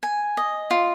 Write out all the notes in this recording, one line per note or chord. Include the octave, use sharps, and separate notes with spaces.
G#5
D#5
F4